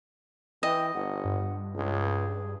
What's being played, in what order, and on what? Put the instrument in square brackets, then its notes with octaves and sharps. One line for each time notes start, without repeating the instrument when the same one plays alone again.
[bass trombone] E3 [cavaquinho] D#5 [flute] G5
[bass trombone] G1 [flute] F#5
[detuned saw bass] G2
[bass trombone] C#2 [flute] G#4